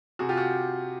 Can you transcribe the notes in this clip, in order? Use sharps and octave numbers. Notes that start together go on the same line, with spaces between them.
C3 F#4 G#4
F4 G4
F#4